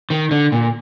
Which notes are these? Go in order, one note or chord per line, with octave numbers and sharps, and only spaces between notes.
D#3
D3
A#2